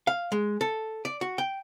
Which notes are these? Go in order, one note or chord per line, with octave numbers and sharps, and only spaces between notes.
F5
G#3
A4
D5
F#4
G5